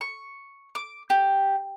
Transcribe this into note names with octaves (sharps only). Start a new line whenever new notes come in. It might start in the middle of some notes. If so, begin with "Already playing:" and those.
C#6
D6
G4